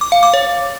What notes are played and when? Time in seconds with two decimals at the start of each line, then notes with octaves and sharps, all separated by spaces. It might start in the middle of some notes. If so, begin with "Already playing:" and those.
0.01 D6
0.12 F5
0.23 D6
0.34 C#5